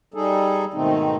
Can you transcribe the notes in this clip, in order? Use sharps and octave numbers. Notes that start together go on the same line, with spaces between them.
G3 D#4 G#4 A4
G#2 B2 D#3 A3 C4 D#4